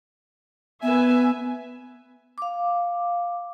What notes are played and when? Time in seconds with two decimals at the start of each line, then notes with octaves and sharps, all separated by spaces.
0.83 B3 B4 E5 G#5
2.38 F5 D6